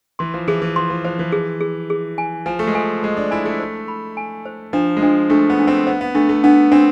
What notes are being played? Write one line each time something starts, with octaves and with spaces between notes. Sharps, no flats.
E3 C6
F3
E3 G#4
E3
F3 C6
F3
F3 C5
E3
G#4
G#4
G#4
G#5
F3 G#5
A3
G#3
F3 G#5
G#3 C5
D4
E4 G#5
A3
C5
B5
G#5
C5
F3 D4
G#3
F3 D4
A3 D4
B3
D4
C4
B3 C5
B3
A3 D4
A3
B3 D4
C4 D4